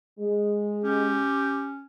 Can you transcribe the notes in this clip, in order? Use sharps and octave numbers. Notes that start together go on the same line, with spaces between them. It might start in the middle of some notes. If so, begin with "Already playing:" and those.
G#3
C#4 G4